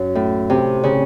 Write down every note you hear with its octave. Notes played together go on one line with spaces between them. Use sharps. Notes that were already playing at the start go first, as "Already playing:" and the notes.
Already playing: F#2
A2
C3
C#3